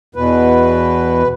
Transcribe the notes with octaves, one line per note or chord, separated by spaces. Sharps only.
E2 B2 B4